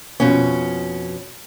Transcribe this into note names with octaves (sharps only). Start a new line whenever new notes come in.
F2 B2 C#4